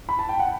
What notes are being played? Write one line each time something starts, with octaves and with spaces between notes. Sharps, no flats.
B5
A5
G5
F#5